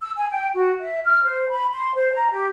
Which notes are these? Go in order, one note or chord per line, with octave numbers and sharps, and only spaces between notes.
E6
G#5
G5
F#4
E5
F6
C5
B5
C6
C5
A#5
G4